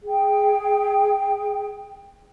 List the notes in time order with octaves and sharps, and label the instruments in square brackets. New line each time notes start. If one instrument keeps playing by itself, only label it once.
[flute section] G#4 G5